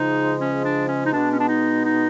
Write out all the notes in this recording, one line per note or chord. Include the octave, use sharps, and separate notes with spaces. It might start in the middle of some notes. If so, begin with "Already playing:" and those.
Already playing: C#3 F3 G#3 D#4
C#4
D4
C#4
D#4
B2 G#3 B3 D4
C#4
D4
D#4
D#4